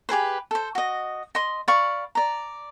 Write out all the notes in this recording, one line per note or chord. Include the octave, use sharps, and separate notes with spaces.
G4 G#4 B4 C5
A4 C5
F#4 D#5
D#5 C6
D5 F5 B5 C#6
D5 A#5